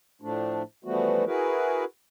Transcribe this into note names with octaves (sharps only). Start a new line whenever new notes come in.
A2 F3 A3 D4
E3 F3 G3 A3 B3 F#4
E4 F#4 G#4 A#4 B4